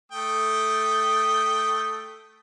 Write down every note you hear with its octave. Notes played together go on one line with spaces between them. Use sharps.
A3 G5 D#6